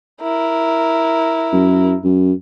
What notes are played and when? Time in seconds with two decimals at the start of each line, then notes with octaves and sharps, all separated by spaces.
0.21 E4 A#4
1.53 F#2
2.04 F#2